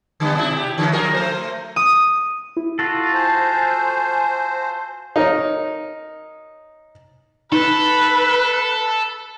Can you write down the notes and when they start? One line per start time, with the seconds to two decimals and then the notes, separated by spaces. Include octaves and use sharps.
0.20 D3 G3 B3
0.35 B2 E4
0.56 G4
0.78 D3 E3 F#3
0.92 F3 A#4
1.14 A3 A#4 C5
1.76 D#6
2.57 E4
2.79 F4 F#4 A4
3.14 C5 G#5 A5
5.16 D#4 A#4 C#5
7.52 D#4 A4 B4